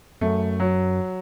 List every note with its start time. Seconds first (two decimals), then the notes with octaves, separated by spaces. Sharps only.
0.21 F#2 A3
0.60 F#3